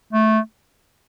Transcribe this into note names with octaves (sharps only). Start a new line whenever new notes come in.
A3